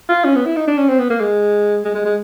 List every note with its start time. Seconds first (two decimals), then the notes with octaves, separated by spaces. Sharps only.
0.09 F4
0.25 C#4
0.36 B3
0.46 E4
0.56 D#4
0.68 D4
0.78 C#4
0.88 C4
0.99 B3
1.10 A#3
1.20 G#3
1.85 G#3
1.95 G#3
2.05 G#3